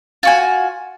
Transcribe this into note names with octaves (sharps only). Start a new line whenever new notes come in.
F4 F#4 G#5